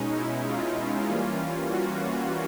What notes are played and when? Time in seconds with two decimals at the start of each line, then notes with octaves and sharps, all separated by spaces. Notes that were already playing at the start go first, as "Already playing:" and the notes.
Already playing: B2 G#3 C#4 D#4
0.14 E4
0.46 F4
1.08 E3 G3 A#3 C#4
1.70 F#4